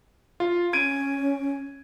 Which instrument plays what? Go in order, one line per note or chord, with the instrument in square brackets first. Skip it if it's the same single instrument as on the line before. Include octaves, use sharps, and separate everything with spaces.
[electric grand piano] F4
[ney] C#4 [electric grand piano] G#6 D7 D#7